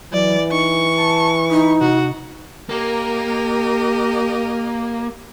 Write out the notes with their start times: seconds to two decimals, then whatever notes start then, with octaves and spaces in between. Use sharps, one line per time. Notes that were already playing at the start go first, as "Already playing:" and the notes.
0.13 E3 F#3 D5
0.52 D#4 C#6
0.98 A5
1.51 D#4 B5
1.81 C3 F#4
2.69 A#3 G4 A#4 D#5